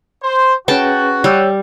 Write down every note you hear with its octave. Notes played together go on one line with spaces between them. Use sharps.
C5
C#4 F#4 G#4 B4 G5 A5
G3 C#5 E6 G6